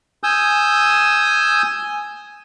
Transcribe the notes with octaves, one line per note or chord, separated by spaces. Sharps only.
G#5 D#6 E6 G6